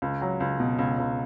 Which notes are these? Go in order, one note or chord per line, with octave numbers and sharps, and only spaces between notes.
C#2
F#3
C#2
B2
C#2
C#2